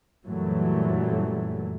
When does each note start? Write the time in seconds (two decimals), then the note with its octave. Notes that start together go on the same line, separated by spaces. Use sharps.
0.25 F#2 A#2 E3 F#3 G3 A3